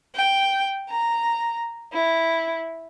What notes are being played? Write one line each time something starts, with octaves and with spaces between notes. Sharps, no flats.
G5
A#5
E4